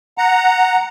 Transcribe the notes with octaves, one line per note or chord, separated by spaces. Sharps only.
F#5 A#5